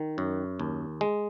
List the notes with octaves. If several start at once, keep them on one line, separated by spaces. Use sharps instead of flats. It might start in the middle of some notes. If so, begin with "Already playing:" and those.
Already playing: D#3
F#2
D#2
G#3